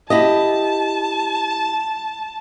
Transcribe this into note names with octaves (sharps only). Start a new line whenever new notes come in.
E4 G4 D#5 A5